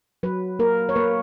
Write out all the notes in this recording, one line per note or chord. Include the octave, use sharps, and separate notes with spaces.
F#3 B4
A#3 A#4
C#5
A#3 B4